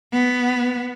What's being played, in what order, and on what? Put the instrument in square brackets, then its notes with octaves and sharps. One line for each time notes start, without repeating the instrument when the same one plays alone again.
[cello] B3